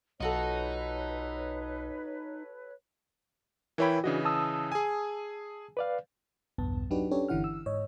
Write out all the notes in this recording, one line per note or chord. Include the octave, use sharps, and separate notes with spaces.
B1 D#4 F4 F#4 A4 B4 C#5
E3 E4 A#4 C#5 G5 B5
C#3 E3 D4 F#4 D#5
A5 D#6 E6
G#4 G#5
B4 D5 F5
B1 E2 G2 B3 A5
F#3 D4 D#4 F#4 G4 B4
C#4 D4 G4 A4 B4 C#5
G1 D3 E3 E4 F#5 F6
E6
G#2 C#5 D#5